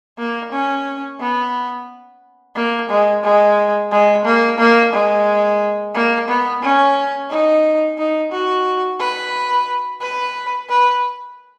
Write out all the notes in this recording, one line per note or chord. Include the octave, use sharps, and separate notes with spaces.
A#3
C#4
B3
A#3
G#3
G#3
G#3
A#3
A#3
G#3
A#3
B3
C#4
D#4
D#4
F#4
B4
B4
B4